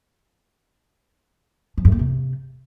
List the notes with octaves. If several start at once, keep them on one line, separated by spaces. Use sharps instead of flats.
F3
G2
A#3
C3